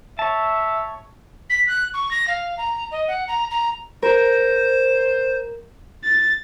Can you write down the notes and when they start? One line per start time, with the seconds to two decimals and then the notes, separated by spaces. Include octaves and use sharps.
0.19 C#5 E5 A5
1.50 B6
1.68 F#6
1.94 C#6
2.11 A#6
2.28 F5
2.58 A#5
2.91 D#5
3.08 F#5
3.28 A#5
3.51 A#5
4.02 A#4 C5
6.04 A6